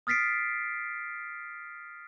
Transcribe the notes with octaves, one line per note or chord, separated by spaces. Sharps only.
D#6 F6 A6 B6 C7 D7